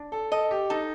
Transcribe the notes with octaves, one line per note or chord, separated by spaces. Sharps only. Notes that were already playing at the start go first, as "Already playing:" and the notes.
Already playing: D4
A4
A4 D#5
G4
D#4 A4